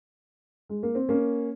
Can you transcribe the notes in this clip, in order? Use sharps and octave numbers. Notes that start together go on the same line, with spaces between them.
G#3
A#3
C4
A#3 C#4